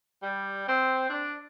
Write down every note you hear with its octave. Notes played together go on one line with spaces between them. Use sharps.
G3
C4
D4